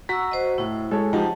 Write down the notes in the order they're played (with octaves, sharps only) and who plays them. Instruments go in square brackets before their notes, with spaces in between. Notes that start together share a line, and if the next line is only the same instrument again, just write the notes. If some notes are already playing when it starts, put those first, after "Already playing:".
[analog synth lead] F#4 [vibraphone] A#5 C#6 E6 [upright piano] B6
[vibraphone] C5 D#5
[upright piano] A2 [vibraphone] E4
[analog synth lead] G#3 [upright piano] A4 C#5
[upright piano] F3 D#4 G4 [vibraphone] F#5 A5